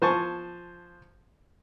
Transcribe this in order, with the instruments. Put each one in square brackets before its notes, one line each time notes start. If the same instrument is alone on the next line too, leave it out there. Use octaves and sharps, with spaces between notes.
[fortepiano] F3 C5 G#5 A5 C#6